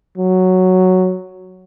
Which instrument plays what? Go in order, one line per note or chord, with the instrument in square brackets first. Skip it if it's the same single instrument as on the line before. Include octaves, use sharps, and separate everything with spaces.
[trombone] F#3